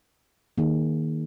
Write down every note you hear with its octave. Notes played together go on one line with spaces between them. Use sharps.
D#3 A#3 D#4 G#4